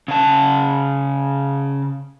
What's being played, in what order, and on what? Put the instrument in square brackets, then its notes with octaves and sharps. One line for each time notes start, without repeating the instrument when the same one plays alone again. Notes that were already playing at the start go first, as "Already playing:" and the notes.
[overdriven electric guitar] C#3 A5